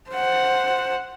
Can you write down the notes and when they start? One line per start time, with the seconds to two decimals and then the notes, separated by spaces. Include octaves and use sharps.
0.10 C5 F#5